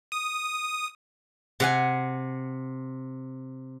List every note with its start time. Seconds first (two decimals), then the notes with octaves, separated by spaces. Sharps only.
0.12 D#6
1.60 C3 F#5 G#5